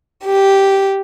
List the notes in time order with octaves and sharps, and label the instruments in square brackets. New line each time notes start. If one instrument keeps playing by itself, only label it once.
[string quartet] G4